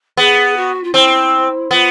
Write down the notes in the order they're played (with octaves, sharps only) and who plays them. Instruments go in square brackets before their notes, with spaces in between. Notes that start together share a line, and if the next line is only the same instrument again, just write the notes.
[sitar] B3 [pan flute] G#4
[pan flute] F#4
F4
[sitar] C4 [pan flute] E4
[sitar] B3 [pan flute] F4